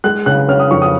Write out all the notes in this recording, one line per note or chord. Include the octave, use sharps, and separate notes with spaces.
G#3 F#6
C#3 F#6
C#4 F6
D#6
F2 C#6
D#6